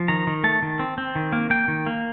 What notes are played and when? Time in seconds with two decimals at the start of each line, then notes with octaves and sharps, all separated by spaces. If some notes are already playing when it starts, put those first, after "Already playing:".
Already playing: F3
0.08 D#3 A#5
0.27 D#3
0.44 A3 A5
0.63 D#3
0.79 C4
0.98 C4
1.15 D#3
1.32 A#3
1.50 A#3 G5
1.68 D#3
1.86 A#3